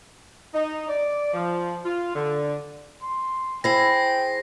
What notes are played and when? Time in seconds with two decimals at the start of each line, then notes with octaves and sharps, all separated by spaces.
0.53 D#4
0.88 D5
1.34 F3
1.84 F4
2.15 D3
3.03 C6
3.64 E4 G#4 C5 G5 A#6 C7